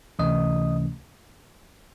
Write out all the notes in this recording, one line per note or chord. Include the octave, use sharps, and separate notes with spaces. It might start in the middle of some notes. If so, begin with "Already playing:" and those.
C#2 C3 E3 A3 C#4 D#5 D#6